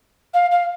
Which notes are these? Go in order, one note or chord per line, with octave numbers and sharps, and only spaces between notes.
F5
F5